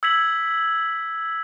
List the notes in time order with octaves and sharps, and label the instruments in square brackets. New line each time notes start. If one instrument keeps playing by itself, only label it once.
[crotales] E6 G#6 B6 F#7